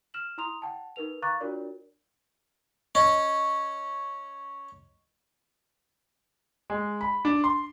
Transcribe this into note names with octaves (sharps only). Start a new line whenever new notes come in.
F6 E7 F#7
E4 A#5 C6 D#6 F7
F#5 G5 A5
D#4 A#4 B4 F7
F5 A#5 C#6 D6 F#6 A6
D4 F4 F#4 A#4 C#5 D5
C#4 D#5
G#3
B5
D4
C6